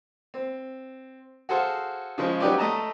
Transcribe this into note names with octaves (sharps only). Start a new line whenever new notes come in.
C4
F#4 G#4 A4 C5 F5
C#3 F3 G#3
F#3 C#4 D#4 G4 B4 D5
A3 D#5 A5 A#5